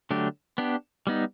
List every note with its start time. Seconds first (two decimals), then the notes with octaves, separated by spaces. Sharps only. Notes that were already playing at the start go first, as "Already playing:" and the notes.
0.11 D3 F#3 A3 D4 G4
0.58 B3 D4 G4
1.07 G3 B3 D#4